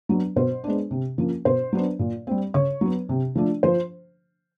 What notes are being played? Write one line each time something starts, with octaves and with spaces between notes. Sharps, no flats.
F#3 B3 D4
B2 C5
G#3 B3 D4
C3
F3 A#3 C#4
B2 C5
F#3 B3 D4
A#2
G3 C4
C#3 C#5
F#3 B3
C3
F3 A3 D4
F3 C5